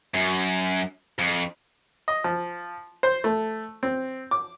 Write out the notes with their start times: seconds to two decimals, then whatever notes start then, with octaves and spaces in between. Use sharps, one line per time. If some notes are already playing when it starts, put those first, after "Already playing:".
0.14 F#2
1.19 F2
2.08 D#5
2.24 F3
3.03 C5
3.24 A3
3.83 C4
4.31 D6